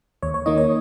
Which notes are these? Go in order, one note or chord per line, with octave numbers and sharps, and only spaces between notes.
D#2 C#5
C#5
D#3 A#3 D#4 D#5
C#5